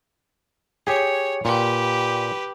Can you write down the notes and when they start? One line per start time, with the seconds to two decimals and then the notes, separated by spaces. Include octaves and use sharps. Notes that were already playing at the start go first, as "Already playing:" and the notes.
0.87 G4 G#4 C#5
1.45 A#2 G4 B4